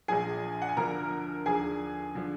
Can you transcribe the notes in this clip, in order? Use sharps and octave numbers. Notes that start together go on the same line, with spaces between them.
A#1 A#2 F3 G#4 G#5
F#5
G#5
D2 D3 F3 A#4 A#5
D#2 D3 F3 G#4 G#5
D3 F3